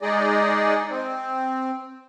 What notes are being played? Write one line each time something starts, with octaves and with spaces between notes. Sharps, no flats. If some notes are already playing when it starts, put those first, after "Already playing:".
G#3 D#4 G#4 D5 D#5
C4